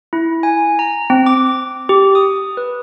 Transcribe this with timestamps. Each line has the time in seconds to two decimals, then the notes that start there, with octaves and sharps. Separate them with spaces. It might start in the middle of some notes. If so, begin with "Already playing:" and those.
0.13 E4
0.43 G#5
0.79 A#5
1.10 C4
1.26 D6
1.89 G4
2.15 D#6
2.57 B4